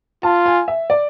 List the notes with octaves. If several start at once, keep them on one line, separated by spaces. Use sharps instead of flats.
F4 A5
G#5
E5
D5